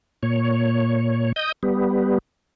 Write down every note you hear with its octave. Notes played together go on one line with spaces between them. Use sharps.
A#2 C#5
D#5 D#6 G6
G3 B3